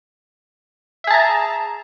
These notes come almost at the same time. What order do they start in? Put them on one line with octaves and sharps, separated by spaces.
E5 G#4 A5 A#5